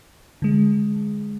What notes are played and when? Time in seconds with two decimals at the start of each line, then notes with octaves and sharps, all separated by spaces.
0.42 D3 G#3